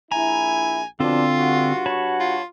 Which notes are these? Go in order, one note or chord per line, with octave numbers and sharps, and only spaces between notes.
A#1 E4 G#5 A#5
B2 D3 F3 C4 D4 F4 A4
G2 F#4
C#5 A5 B5
F4